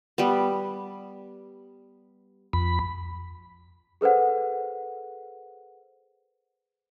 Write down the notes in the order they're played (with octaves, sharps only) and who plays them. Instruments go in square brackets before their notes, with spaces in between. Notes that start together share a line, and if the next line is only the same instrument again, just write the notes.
[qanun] G3 B3
[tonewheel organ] F2 B5
[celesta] G#4 A4 B4 C5 F#5